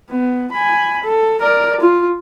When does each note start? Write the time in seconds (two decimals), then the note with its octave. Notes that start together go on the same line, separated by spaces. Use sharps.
0.10 B3
0.52 G#5 B5
1.03 A4
1.42 A#4 D5
1.80 F4